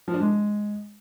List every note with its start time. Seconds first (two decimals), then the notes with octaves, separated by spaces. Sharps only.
0.08 F3
0.14 D4
0.20 G#3